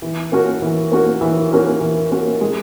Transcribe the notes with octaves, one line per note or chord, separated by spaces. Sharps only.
E3
A#3 C#4 F#4 A#4
E3
A#3 C#4 F#4 A#4
E3
A#3 C#4 F#4 A#4
E3
A#3 C#4 F#4 A#4
G#3